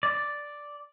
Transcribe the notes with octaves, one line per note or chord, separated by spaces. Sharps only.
D5